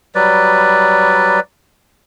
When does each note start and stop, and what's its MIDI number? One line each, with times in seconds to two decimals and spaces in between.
0.15 1.40 54
0.15 1.40 55
0.15 1.40 71
0.15 1.40 74